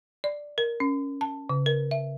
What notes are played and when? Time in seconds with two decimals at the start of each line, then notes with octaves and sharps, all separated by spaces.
0.24 D5
0.58 A#4
0.80 C#4
1.21 A5
1.50 C#3
1.66 A#4
1.91 E5